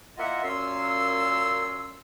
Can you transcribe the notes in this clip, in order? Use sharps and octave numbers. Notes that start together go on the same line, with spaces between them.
A#3 E4 F4 D#5 E5 F#5
F#2 A#2 C#4 F5 C6 E6